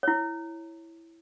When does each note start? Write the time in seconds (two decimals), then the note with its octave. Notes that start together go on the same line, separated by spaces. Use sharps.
0.03 E4 C#5